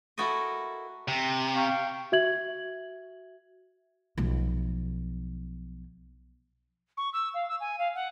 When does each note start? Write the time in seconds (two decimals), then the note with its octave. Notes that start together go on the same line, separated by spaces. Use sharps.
0.18 E4 F#4 A4 A#4 D#5
1.08 C3
1.55 F5 G5 C#6
2.12 F#4 E5 G#6 F#7
4.18 B1 F3
6.97 C#6
7.13 E6
7.34 F5
7.48 E6
7.60 G#5
7.78 F5
7.95 F#5